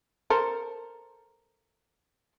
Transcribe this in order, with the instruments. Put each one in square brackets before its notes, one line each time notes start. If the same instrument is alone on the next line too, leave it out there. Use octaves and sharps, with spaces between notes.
[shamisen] A4 A#4 C5